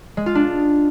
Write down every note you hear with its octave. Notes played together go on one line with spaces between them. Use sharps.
G#3
F4
D4